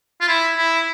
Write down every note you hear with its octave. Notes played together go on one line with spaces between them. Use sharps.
F4
E4
E4